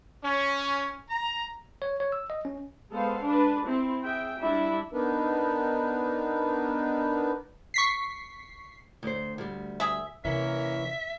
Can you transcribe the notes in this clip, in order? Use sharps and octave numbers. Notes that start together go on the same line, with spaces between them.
C#4
A#5
C#5
C#5
E6
D#5
C#4
G#3 B3 A4 C5 F5
D4 B4
C4 E4
G#4 E5 G5
G3 D4 E4 E5
B3 D4 D#4 A#4 B4
C#6 B6 C7
D2 C5
D2 G3
G#4 E5
C3 E3 A#3 C#4 A#4 E5